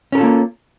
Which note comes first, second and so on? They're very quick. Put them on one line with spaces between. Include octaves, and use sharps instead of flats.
C#4 A#4 A4 F4 A#3